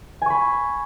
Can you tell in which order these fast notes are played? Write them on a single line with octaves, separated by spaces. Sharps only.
G#5 C#6 B5